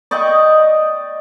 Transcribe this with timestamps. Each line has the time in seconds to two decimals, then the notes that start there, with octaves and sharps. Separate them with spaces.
0.11 D5 D#5 G5 C#6